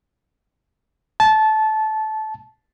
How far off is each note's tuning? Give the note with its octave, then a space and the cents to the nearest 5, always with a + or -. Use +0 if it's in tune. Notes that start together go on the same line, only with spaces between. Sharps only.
A5 -20